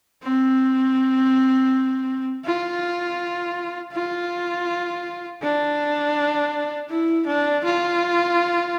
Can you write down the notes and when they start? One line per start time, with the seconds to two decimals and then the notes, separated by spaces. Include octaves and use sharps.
0.23 C4
2.45 F4
3.93 F4
5.42 D4
6.90 E4
7.26 D4
7.64 F4